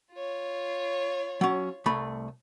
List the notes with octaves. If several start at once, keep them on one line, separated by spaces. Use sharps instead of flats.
F4 C#5
F#3 C#4
C2 A3 B5